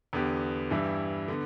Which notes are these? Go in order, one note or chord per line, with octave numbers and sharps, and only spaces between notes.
E2 D3 B3 G4
G2 E3 G3 E4
D3 B3